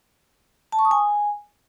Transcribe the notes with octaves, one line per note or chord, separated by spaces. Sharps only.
A5
C#6
D#6
G#5